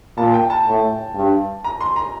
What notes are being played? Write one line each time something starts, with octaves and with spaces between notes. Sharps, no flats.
A#2 A5
G5
A5
A2
G2
A#5
C6
A#5